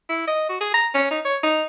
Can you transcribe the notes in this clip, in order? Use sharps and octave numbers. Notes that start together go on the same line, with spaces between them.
E4
D#5
F#4
G#4
A#5
C#4
D#4
C#5
D#4